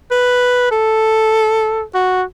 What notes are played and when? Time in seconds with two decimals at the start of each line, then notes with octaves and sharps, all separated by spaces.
0.11 B4
0.71 A4
1.95 F#4